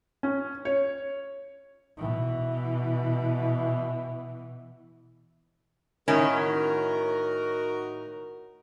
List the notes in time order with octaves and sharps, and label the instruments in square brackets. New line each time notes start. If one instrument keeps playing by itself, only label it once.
[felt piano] C#4
C#5
[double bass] B2 E3
[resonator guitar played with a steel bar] A2 D#3 C#4 [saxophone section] D#4 F#4 A#4